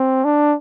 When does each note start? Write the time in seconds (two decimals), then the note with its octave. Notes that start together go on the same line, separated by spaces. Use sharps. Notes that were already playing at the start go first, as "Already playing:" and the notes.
Already playing: C4
0.25 D4